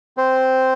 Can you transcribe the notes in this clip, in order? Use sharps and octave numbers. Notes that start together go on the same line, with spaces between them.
C4 C5